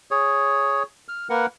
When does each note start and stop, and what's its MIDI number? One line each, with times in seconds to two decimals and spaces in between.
0.11 0.83 68
0.11 0.83 73
1.08 1.28 89
1.30 1.46 58
1.30 1.46 70
1.30 1.46 71
1.30 1.46 78